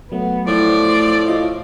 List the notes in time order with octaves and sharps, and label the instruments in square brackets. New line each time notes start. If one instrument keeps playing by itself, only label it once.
[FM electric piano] F#3 A3 [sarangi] B3
[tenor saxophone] A2 [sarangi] F3 [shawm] D5
[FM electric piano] F4 D#5